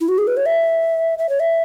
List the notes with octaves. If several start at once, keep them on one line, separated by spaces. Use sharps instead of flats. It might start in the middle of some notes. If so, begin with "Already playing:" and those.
E4
F#4
G#4
B4
C#5
E5
E5
C#5
E5